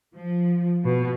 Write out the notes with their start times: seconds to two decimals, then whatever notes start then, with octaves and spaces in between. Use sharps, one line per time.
0.15 F3
0.84 B2